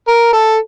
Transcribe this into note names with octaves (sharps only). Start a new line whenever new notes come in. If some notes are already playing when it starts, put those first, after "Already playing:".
A#4
A4